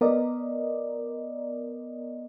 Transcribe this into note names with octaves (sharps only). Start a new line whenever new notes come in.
B3 A#4 D5 D#5